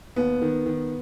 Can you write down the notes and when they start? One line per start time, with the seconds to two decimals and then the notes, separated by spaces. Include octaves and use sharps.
0.16 D#2 B3
0.42 D#3
0.66 D#3